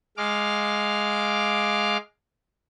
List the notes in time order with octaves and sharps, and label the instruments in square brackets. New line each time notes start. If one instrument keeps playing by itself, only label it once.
[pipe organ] G#3 F5 D6 F6